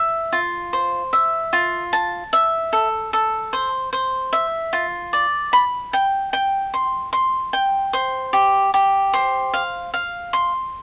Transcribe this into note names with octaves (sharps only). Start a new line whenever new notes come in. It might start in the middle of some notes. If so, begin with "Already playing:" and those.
Already playing: E5
F4
C5
E5
F4
A5
E5
A4
A4
C5
C5
E5
F4
D5
B5
G5
G5
C6
C6
G5
C5
G4
G4
C5
F5
F5
C6